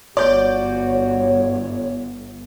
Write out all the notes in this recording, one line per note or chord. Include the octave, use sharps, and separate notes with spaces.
G1 B3 F#4 C#5 D5 G6